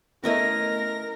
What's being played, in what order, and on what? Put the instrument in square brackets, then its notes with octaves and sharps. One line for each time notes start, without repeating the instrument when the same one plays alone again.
[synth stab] A3 B3 [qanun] C#4 E4 D#5 [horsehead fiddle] A#4 [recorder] A#6